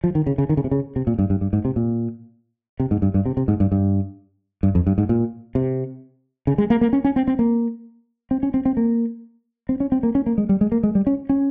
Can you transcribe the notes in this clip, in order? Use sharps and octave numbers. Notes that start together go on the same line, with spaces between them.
F3
D#3
C#3
C#3
D#3
C#3
C3
C#3
C3
A#2
G2
G2
G2
G#2
C3
A#2
C3
G#2
G2
G2
C3
C3
G#2
G2
G2
G2
F2
G2
G#2
A#2
C3
C#3
G#3
A#3
A#3
C#4
C#4
C4
C4
A#3
C4
C#4
C4
C4
A#3
C4
C#4
C4
A#3
C#4
A#3
G#3
G3
G#3
A#3
G#3
G3
C#4
C#4